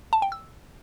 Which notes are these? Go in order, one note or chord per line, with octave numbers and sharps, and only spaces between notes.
A5
G5
E6